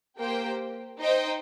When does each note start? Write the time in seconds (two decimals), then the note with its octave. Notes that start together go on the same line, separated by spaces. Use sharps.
0.19 A#3 G4 C5 G5
1.00 D#4 C5 D#5 G5